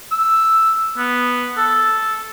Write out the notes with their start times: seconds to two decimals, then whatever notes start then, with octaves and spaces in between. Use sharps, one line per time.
0.12 E6
0.98 B3
1.58 A4